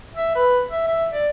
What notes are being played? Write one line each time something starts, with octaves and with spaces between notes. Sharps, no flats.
E5
B4
E5
E5
D5